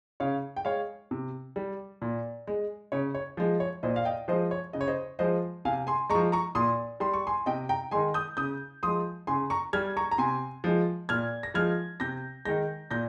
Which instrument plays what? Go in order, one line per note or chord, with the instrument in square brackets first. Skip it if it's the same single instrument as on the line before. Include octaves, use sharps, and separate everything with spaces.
[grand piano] C#3 C#5 F5
G5
G#3 C#5 F5
C3
G3
A#2
G#3
C#3 C#5
C#5
F3 G#3
C#5
A#2 C5 D#5
F5
D#5 G5
F3 G#3 C5 D#5
C#5
C#3 D#5
C#5
C5 D#5
F3 G#3 C5 D#5
C3 F5 G#5
G#5 C6
G#3 A#5 C#6
F3
A#5 C#6
A#2 C6 D#6
G3 C6
C#6
G#5 C6
C3 D#5 G5
G5 A#5
G#3 G#5 C6
D#3
D#6 G6
C#3 D#6 G6
F3 G#3 C6 D#6
C#3 G#5 C6
A#5 C#6
G3 F6 G#6
A#5 C#6
A#5
C3 G#5 C6
F3 G#3
A#2 F6 G#6
A#6
F3 G#3 F6 G#6
C3 G6 A#6
D#3 G#3 G6 A#6
A#2 G6 A#6